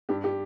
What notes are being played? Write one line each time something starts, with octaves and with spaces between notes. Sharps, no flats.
G2 G4
G4